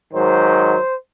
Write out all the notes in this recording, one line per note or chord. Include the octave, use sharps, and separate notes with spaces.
G#2 D#3 F#3 C5